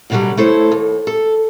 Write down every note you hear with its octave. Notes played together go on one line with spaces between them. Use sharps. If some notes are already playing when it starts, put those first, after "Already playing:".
F#2 B2 D3 E3 F#3 G3
A3 E4 A4 C5 C#5
D#2
A4